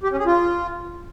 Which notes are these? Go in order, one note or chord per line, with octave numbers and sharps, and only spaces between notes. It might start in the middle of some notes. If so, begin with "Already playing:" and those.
G4
C#4
G#4
F4